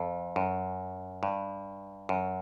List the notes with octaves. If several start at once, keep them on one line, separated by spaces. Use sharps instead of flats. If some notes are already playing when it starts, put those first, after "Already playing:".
Already playing: F2
F#2
G2
F#2